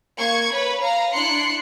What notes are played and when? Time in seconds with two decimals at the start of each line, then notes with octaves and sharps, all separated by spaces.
0.18 A#3 C#6 G#6
0.52 B4 C#5 B5
0.82 F5 A#5
1.14 D4 E4 C6 F#6 C7 C#7